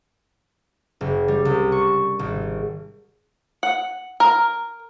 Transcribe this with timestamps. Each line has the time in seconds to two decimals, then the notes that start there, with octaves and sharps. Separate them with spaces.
1.01 F#1
1.28 G3
1.45 C2
1.72 C#6
2.19 G#1
3.63 F#5
4.20 A#4